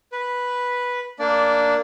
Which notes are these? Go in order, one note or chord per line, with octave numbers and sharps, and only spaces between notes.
B4
A#3 D4 D5